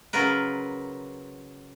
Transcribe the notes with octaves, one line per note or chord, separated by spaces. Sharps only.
C#3 F#3 F4 A#4 B4